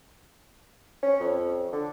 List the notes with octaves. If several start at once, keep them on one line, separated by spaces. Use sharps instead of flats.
C#4
F2
D3